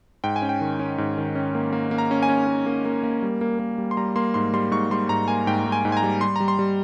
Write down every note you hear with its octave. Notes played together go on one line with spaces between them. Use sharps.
G#2 G5
G#5
C#4
G5
D#3
C#4
G#2
D#3
C#4
A#3
A#3
A#3
A#5
C#4
G#5
C#4
A#3
A#3
A#3
A#3
G3
A#3
A#3
G3
C6
G3 A#5
A#3 C6
G#2 C6
G3 C6
G#2 C#6
G3 C6
G#2 A#5
A#3 G#5
G#2 G5
G#2
G#5
G#2
G#5
A#5
G3
G3 C6
G3 A#5
C6
G3